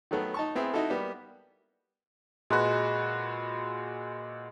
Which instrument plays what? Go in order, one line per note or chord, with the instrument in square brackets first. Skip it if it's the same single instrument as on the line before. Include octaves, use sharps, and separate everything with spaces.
[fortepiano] D#3 F#3 A3 B3
D#4 A5 C#6
B3 C4 E4 G#4
D#4 E4 F#4 A4
G3 A#3 B3
[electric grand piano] A#2 F#4 [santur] G#3 B4